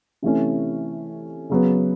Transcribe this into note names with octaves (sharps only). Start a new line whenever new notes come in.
C3 E3 A3 C#4
C#3 F#3 B3